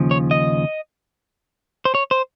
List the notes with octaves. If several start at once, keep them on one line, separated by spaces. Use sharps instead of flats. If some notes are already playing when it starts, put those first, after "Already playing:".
Already playing: D#2 C#3 F3
C#5
D#5
C5
C#5
C5